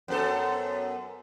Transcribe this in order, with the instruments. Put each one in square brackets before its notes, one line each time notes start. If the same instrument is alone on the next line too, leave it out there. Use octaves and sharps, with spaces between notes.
[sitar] F#2 B3 A4